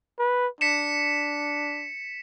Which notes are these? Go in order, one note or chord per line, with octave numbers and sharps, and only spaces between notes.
B4
D4 B6 C#7 E7